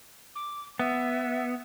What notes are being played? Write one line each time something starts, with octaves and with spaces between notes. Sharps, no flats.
D6
B3 E5